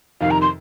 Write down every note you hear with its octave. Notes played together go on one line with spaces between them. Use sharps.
F2 C3 D#3 F5
A#5
C6